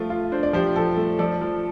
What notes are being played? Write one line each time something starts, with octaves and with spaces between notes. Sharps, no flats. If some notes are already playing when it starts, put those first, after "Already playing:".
Already playing: F3 A3 F4
F4
D4 C5
D5
F3 G4 C5
F3 A4
A3
F3 A4 D5
F3